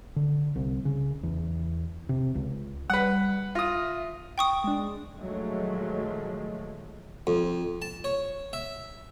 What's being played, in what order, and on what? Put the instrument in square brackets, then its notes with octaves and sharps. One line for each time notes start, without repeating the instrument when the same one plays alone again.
[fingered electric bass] D3
C2
C#3
E2
C3
C#2
[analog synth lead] G3 [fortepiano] B4 F#5
[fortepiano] F4 D#6 [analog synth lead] A#6
[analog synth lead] E5
[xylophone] G5 C#6 D#6
[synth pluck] G#3 D4
[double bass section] A#2 D#3 F3 F#3 G#3 A3
[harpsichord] F2
A5
C#5
E5